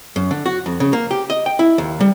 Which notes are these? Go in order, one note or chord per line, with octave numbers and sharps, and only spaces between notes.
F#2
D3
F#4
F2
C#3
A#3
G4
D#5
G5
E4
D#2
G3